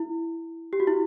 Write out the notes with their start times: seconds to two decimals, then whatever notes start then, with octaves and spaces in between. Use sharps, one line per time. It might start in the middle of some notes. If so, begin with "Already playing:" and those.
Already playing: E4
0.73 G4
0.80 F#4
0.87 E4